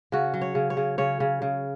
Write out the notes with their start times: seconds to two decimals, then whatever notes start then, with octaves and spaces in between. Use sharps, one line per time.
0.12 C#3 F#4
0.34 F#3
0.41 C#5
0.55 C#3
0.70 C#5
0.77 C#3
0.98 C#3 C#5
1.20 C#3
1.42 C#3